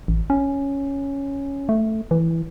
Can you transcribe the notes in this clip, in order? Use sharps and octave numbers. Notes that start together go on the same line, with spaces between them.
A1
C#4
A3
E3